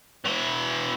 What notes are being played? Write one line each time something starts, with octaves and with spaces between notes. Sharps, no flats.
E3 F#4